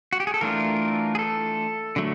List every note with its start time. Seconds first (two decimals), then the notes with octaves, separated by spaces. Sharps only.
0.13 F#4
0.20 G4
0.27 G#4
0.34 A4
0.41 E3 A3 D4 F4 A#4
1.15 G#4
1.19 A4
1.96 D3 F#3 A3